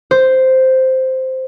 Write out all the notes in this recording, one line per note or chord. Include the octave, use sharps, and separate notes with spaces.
C5